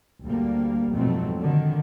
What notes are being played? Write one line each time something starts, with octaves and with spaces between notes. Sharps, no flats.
D2 G3 A#3
F2 G#2 B2 F#3 A3 C4
D3 D#3